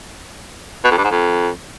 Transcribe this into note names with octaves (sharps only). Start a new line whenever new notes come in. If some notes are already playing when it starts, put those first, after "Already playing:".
B2
F2
G2
G#2
F2